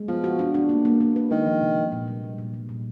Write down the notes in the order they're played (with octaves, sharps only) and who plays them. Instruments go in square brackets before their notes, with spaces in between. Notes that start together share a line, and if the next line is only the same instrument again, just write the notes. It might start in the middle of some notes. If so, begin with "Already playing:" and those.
Already playing: [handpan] G#3
[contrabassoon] F3 [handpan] B3
[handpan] F#4
D4
D4
A#3
A#3
A#3
B4
[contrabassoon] D#3 [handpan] G#3
[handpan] F3
C3
F3
A#2
G3
G3
A#2
G3
A#2